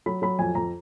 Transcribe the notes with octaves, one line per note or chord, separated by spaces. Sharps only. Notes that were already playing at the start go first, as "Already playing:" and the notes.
F#3 B5
F#3 B5
F2 G#5
F2 A#5